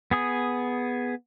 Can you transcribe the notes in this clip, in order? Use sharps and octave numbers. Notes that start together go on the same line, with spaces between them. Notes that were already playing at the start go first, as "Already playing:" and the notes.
B3 G#4 D#6